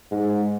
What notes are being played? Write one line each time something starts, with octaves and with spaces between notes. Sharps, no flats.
G#2